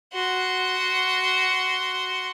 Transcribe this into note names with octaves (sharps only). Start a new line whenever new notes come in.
F#4 C6